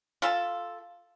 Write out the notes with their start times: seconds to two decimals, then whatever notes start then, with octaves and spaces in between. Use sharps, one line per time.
0.22 F4 A4